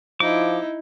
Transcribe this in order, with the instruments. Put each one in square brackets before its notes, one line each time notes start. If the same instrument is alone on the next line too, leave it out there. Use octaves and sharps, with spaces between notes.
[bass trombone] F3 [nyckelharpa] D#4 E4 [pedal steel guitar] D6